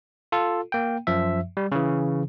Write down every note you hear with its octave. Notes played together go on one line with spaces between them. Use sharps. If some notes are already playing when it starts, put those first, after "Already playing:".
F4 A4
A#3 G5
F#2 F3 E5
G3
C#3 E3